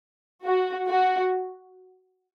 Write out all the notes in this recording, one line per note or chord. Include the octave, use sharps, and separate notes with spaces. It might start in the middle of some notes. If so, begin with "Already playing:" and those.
F#4
F#4